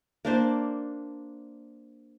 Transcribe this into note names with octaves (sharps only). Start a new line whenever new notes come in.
A#3 D4 C5